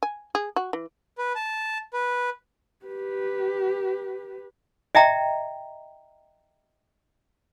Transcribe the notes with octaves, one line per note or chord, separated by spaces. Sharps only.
G#5
G#4
F#4
E3
B4
A5
B4
G4 B4
D#5 E5 G5 A#5